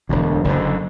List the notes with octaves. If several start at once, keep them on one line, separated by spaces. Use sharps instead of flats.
E1 D2 D3
F#1 F#2 D3